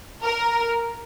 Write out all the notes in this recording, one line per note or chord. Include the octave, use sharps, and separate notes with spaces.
A#4